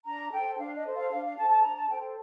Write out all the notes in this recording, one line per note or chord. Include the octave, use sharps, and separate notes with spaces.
D4 A#5
A4 C5 G5
D4 F5
D#5
A4 C5
F5
D4 F5
F5
A4 C5 A5
A5
D4 A#5
A5
A4 C5 G5